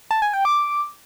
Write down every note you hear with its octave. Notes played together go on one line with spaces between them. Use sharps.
A5
G#5
G5
D6